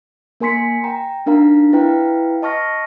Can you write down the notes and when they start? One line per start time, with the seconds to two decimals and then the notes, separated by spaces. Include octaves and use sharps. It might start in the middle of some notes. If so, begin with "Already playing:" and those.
0.40 A#3 A#4 G#5 C6 B6 C#7
0.84 G5 A#5
1.26 D4 D#4 A#4 F5 A#5
1.73 E4 B4 F5 G5 A#5
2.42 D#5 A5 C#6 F6 A#6